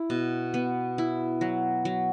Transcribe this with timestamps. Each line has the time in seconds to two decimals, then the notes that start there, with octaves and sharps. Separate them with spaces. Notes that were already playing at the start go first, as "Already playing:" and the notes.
Already playing: E4
0.10 B2
0.54 B3
0.98 E4
1.41 F#3
1.85 F#3